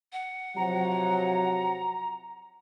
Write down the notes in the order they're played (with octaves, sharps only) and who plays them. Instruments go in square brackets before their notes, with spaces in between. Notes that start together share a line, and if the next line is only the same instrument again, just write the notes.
[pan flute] F#5
[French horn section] C3 F3 F#3 [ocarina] A#5